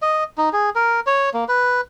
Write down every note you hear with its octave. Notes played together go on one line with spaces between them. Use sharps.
D#5
D#4
G#4
A#4
C#5
A#3
B4